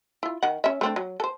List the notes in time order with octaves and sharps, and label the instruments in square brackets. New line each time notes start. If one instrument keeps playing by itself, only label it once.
[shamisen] E4 F4
D#3 F#5
C#4 E5
A3 C4 D4
F#3
A4 C5